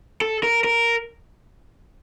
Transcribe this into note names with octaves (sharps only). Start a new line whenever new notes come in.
A4
A#4
A#4